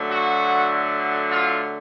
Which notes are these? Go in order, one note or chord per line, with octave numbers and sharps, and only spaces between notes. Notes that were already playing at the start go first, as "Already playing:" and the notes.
Already playing: D3 F#3 A3
F#4
F4